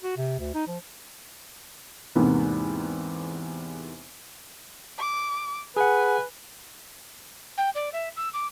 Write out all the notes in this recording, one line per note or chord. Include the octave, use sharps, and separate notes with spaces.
F#4
C3
D2
D#4
F3
E2 G#2 C3 A#3 B3
D6
G#4 B4 F#5 G#5
G5
D5
E5
E6
D6